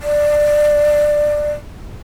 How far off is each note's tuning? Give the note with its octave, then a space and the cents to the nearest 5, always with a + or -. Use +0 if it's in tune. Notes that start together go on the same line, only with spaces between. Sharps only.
D5 +15